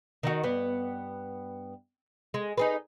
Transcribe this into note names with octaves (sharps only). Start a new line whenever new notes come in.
D#3 D#4 F#4
G2 B3
G#3
D#4 G#4 B4